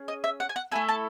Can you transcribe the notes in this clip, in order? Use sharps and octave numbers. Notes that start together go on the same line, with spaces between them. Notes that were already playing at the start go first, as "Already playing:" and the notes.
Already playing: C#4 G#4
D#5
E5
F#5
G#5
F#5
A3 E4 A4 G#5
A5